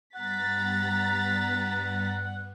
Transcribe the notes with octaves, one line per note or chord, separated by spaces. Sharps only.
G2 G3 B3 F#5 A#5 A6 B6